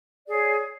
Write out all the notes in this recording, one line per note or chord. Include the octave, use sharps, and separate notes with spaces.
G#4 C#5 D5